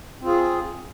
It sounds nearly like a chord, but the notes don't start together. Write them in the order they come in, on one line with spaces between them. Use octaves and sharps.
C4 F4 G#4